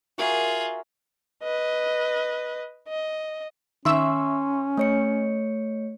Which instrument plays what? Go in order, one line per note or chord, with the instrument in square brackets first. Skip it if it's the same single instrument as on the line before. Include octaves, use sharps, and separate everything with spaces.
[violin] F4 G#4 [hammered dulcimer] F#4 A#4 E5
[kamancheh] B4 D#5
D#5
[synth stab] D#3 E5 E6 [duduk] C#4 [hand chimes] C6 C#6
[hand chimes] A3 C#5 C#7